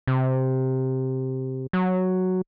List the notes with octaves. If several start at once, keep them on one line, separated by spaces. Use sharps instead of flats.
C3
F#3